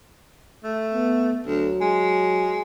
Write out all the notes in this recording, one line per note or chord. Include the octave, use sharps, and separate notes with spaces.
A3
B3
D2 F#3
G#3